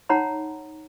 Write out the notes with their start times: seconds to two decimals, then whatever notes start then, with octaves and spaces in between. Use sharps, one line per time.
0.09 D#4 C#5 F#5 A#5 B5